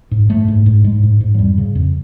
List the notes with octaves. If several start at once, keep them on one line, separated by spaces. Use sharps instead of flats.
G#2
G#2 A3
G#2
G#2
G#2 G#3
G#2
G#2
F#3
F2 G3
C#3
F2